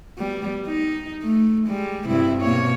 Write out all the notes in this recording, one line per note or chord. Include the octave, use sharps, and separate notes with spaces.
G3 B3
D#4
A3
G3 G#3
G2 C3 E4
B2 A#3 C#5